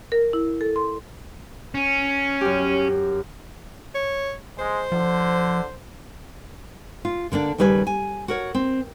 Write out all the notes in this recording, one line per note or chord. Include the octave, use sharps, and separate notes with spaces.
A#4
E4
A4
C6
C#4
F#2 G4
C#5
G#3 C5
D3 F3
F4
D3 A#3 C4 D4
D#2 C#3 G3 B4 C#5 G#5
G#5
F#4 A#4 C#5
C4